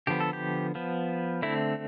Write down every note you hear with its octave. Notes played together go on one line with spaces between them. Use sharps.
D3 F3 B3 G4
A4
G4
F3 B3
D3 A3 C4 E4